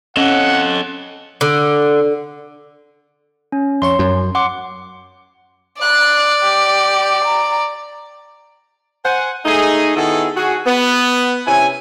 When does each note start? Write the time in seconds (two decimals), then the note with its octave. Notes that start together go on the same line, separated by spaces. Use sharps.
0.17 C#4 A4 D#5 F#5
1.41 D3
3.52 C#4
3.82 F2 C#5 C6 C#6
3.99 F#2 C#4
4.35 F#5 C6 D6
5.82 D5 F#6
6.43 G4
7.25 A#5
9.05 C5 F#5 G#5
9.45 A3 D#4 G#4
9.96 D#3 B3 E4 F#4 G#4 A4
10.37 F#4 G#4
10.67 B3
11.47 C3 C#4 E4 G#5